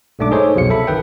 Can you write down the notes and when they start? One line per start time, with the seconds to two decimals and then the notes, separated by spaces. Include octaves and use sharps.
0.19 B1 G#2 A3 D4 D6
0.31 D#4 G#4 A4 C5 C#5
0.55 C2 F2 B2 F#3 F5 C#7
0.70 A4 E5 B5
0.87 A1 D#3 B4 G5